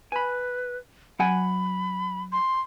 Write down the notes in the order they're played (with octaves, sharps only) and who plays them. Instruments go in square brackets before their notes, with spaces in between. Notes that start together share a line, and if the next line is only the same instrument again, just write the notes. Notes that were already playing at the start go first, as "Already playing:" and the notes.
[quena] B4 [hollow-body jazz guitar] G#5 B5
[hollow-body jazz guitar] F#3 F#5 G#5 [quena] B5
[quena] C6